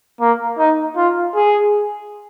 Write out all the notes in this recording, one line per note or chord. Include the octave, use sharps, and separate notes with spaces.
A#3
D#4
F4
G#4